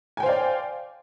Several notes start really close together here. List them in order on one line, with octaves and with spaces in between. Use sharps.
G#5 G5 C5 F5 D5